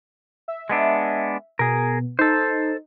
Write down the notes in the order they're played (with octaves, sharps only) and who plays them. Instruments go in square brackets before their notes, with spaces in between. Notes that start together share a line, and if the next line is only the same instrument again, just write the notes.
[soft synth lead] E5
[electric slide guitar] G#3 B3 D4
[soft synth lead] B2 [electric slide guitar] G#4 A#4
[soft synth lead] D#4 [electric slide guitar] A4 C5